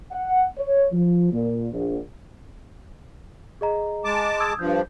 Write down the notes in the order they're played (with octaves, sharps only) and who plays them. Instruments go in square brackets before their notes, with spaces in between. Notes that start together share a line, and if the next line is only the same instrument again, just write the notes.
[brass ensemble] F#5
C#5
F3
A#2
A#1
[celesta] G#4 D#5 A#5
[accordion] G#3 A5 D6
[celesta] D#6 E6 G#6
[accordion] G2 F3 [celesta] G6